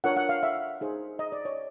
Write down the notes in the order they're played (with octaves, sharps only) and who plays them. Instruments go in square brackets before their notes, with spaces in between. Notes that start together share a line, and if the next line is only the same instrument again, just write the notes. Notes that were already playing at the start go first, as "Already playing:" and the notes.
[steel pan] D4 F4 A#4 C#5 F#5
F#5
F5
E5
D#4 G#4 C5
D#5
D5
C#5